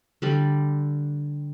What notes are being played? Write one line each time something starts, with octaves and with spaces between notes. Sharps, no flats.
D3 G3